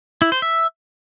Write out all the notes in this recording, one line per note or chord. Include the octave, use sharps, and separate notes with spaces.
E4
C5
E5